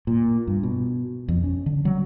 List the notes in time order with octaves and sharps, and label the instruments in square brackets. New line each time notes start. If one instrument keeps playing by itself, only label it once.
[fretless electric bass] A#2
G2
B2
F2
C#4
D3
F#3